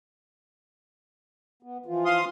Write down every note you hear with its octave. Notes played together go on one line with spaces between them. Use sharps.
B3
E3 F3 F4
F5 C6 D#6